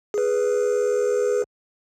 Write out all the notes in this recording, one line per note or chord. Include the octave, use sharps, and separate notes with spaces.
G#4 B4